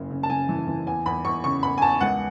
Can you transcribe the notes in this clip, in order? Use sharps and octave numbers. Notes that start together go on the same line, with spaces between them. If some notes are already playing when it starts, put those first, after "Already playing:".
Already playing: F#1 C#3
C#3
A5
C#3 G#5
E3
E3
E2 G#5
E2 B5
E2 C#6
C#3 C#6
E2 B5
G#5
E2 A5
C#2 F#5